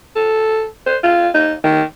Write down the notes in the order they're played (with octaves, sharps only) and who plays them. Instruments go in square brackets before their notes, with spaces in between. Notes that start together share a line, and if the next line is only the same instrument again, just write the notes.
[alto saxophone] A4
C5
F4
D#4
D#3